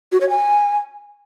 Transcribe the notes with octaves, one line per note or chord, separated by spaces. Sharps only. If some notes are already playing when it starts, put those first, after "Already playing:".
F#4
C#5
G#5